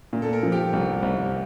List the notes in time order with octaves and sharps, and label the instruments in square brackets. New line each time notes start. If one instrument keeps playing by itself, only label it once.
[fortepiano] A#2
[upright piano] A4
A#4
[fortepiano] F3
[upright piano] G4
[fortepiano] C2
C2